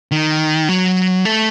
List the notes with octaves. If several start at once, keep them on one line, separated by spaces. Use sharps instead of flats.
D#3
F#3
A3